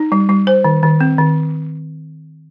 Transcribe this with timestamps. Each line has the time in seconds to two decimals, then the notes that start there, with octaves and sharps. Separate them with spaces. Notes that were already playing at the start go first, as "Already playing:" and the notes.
Already playing: D#4
0.12 G3
0.29 G3
0.47 C5
0.64 D#3
0.83 D#3
1.01 C4
1.18 D#3